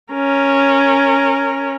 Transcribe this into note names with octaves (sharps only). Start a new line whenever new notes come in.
C#4 A#4